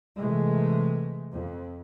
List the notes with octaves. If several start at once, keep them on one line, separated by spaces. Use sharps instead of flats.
C3 E3 G#3 A3
F2